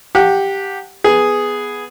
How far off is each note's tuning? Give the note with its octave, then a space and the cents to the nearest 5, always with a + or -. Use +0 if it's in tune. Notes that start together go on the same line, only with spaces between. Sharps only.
G4 +0 F#5 -15 A5 +30
B3 +0 G#4 +0